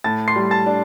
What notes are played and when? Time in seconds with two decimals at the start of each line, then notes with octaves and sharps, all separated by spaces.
0.04 A2 A5 A6
0.28 C6 C7
0.36 G3
0.51 A5 A6
0.66 D4